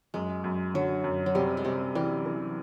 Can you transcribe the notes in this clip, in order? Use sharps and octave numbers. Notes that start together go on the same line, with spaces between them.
F#2 G#3
F#2
D3 F#3
F#2
F#3
C3 G3
G#3
C3 G3
E3 G3
E3